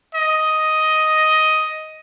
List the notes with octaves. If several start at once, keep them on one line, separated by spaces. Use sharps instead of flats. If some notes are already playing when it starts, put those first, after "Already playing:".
D#5